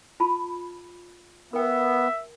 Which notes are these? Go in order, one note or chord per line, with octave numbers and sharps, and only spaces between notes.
F4 A5 B5
B3 A#4 E5 G5